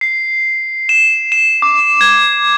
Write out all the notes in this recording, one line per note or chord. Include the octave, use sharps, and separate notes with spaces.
C7
E7
E7
D6
G#6